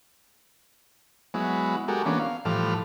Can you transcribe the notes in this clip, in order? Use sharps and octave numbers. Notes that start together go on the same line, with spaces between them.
F#3 G#3 B3 E4
G#3 F#4 G4 A4 A#4
E3 A#3 B3 C#4 D4
F5
A2 E3 F3 G3 A4 F6